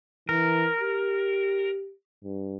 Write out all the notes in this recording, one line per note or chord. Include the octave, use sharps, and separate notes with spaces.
E3 A#4
G4
G2